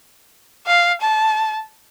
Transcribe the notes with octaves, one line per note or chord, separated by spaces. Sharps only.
F5
A5